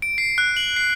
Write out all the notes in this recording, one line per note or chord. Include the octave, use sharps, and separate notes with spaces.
D7
C7
F#6
F#7
C7